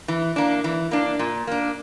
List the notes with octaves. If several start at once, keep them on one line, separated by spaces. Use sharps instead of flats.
E3
A#3 D4
E3
A#3 D4
A#2
A#3 D4